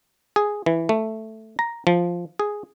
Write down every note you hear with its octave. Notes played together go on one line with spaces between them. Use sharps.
G#4
E3
A3
A#5
F3
G#4